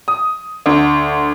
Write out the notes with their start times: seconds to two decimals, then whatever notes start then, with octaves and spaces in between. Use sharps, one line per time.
0.08 D#6
0.66 D2